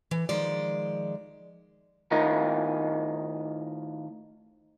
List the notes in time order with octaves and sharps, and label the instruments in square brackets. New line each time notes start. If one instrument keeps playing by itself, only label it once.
[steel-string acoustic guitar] E3
D#3 F3 G#3 D5
[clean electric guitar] A2 D#3 F4 A#4 D#5